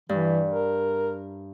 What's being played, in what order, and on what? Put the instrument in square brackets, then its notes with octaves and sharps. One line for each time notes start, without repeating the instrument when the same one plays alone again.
[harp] G2 [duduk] E3
[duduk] A#4